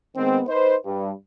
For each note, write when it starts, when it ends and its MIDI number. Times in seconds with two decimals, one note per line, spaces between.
0.17 0.41 51
0.17 0.41 56
0.17 0.41 59
0.17 0.41 60
0.48 0.76 63
0.48 0.76 71
0.48 0.76 72
0.86 1.11 43